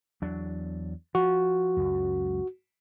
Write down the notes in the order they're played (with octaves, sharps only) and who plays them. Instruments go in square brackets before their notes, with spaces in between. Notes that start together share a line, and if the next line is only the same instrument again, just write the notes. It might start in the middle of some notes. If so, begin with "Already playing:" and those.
[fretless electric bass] E2 F#3 D4
[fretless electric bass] F3 [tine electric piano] F#4
[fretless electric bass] C#2 F#2